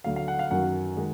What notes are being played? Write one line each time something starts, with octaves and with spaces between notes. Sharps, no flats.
D2 D3 F#3 F5
F5
F#5
F5
F#2 D#3 F#3 F#5
D#3 G#3